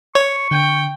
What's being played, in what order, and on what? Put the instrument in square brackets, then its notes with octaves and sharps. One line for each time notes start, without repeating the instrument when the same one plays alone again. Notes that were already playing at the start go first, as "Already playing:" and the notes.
[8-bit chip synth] C#5 [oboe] C#6
[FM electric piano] D3 [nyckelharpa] G5